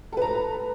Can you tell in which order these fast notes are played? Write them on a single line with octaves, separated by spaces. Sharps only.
A4 B4 A#5